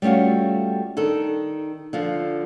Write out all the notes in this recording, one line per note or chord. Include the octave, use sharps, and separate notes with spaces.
G3 A3 C#4 F4 F#4
D#3 D4 A4
D3 F3 F4